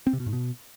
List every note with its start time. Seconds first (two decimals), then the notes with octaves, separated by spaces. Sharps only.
0.07 C4
0.13 C3
0.20 B2
0.26 G#2
0.33 B2